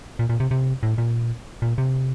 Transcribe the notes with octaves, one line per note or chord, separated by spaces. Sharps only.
A#2
A#2
C3
C3
A2
A#2
A#2
C3